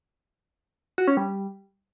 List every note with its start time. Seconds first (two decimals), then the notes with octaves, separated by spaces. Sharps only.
0.98 F#4
1.08 C#4
1.17 G3